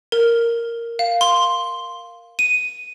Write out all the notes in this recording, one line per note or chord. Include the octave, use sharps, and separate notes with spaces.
A#4
F5
C6
D#7